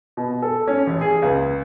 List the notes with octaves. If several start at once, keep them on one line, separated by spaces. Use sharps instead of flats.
B2
A4
C#4
A1
G#4
C#2